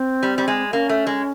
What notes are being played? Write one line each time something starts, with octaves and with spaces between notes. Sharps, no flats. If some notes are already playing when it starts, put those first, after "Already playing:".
Already playing: C4
G3
G3
G#3
A#3 C#4
A3
G#3